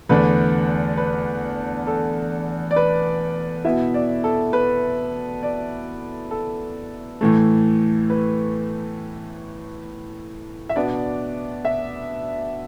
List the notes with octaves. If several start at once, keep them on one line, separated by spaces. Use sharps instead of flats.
E2 D3 A3 D4 B4
B4
A4
D5
B4
B2 B3 E4 E5
D5
A4
B4
D5
A4
A2 E3 A3
B4
E5
B2 B3 D4 D5
E5